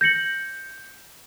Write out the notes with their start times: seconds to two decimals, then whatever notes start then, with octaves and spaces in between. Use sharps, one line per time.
0.01 G6 A#6 C#7 F#7